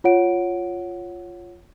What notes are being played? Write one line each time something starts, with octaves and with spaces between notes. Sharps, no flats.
F4 C#5 F#5 D7